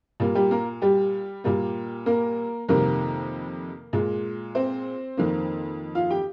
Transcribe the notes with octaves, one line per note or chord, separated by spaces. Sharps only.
A#2 G3 A#3
G3 G4
A#3 A#4
G3 G4
A#2 G3 A#3
A#3 A#4
F2 C3 D#3 G3 A#3 A#4
A#2 G#3
C4 C5
F2 D#3 A#3
F4 F5
G4 G5